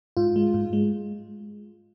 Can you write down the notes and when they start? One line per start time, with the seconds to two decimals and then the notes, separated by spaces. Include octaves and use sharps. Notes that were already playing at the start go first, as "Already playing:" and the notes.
0.17 G#2 F4
0.36 G#3
0.54 G#2
0.73 G#3